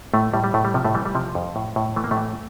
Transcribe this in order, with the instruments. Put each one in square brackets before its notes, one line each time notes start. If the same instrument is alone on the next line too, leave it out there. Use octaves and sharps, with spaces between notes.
[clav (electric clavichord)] A2 A3
A2 G3
G3
A2 A3
G3
C3 F3
A2 A3
E3 G3
G3
C3 F3
F2
A2
A2
E3 A3
A#3
A2 A3
E3